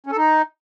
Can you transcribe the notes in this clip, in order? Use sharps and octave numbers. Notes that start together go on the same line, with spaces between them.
C#4
A4
D#4